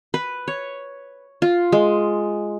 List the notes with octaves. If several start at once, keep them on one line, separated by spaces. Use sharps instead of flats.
B4
C#5
F4
G#3